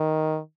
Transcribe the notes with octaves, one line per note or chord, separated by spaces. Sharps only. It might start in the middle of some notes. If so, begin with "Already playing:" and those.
Already playing: D#3